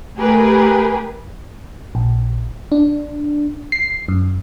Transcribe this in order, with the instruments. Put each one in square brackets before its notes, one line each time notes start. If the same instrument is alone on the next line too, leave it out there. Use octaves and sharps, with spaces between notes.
[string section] A3 G4 G#4 A#4 B4
[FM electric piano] A#1
D4
C7
F#2